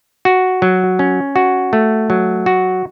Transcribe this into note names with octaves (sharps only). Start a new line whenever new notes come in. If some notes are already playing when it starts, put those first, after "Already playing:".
F#4
F#3
C#4
F#4
A3
F#3
F#4